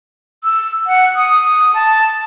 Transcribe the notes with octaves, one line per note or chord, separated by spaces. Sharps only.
E6
F#5
D#6
A5